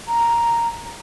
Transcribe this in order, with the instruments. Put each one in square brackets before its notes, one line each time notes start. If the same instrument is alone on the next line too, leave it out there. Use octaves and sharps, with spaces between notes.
[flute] A#5